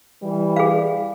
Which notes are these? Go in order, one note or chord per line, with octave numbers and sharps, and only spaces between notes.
E3 G3
G#4 F5